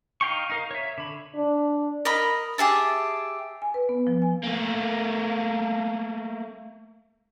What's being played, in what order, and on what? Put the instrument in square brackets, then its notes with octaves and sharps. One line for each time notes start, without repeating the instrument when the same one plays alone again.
[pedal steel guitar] D#4 F5 G5 C#6
D#4 A#4 F5
C#5 E5
D3 B5
[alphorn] D4
[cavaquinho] A#4 D#5 B5
G4 G#4 E5 A5
[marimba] G#5
B4
B3
F3
G#5
[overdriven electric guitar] A3 A#3